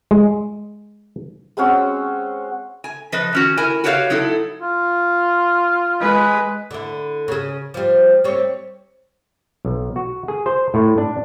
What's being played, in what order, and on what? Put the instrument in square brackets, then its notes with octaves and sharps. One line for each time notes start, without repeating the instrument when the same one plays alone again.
[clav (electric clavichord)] G#3
[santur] G#3 C4 C#4 F#4
[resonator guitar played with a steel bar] G#5
F3 B4 D#5
D#3 C#4 F#4
E4 A#4 G#5
F#4 G4 B4 C#5 D5 F5
F#3 D#4 E4 A4
[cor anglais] F4
[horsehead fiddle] G#3 B4
[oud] D3 E4
C#3 G#4
F3 G3
G3 C4 C#5
[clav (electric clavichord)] B1
F#4
G#4
C5
A2
D4